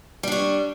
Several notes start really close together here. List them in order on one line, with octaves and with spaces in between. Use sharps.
G3 D4 C#5